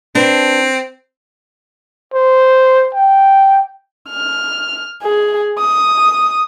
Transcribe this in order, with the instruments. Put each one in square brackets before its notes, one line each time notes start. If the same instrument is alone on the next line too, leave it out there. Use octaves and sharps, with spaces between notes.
[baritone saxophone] C4 [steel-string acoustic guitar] D4 B4
[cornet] C5
G5
[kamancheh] F6
G#4
D#6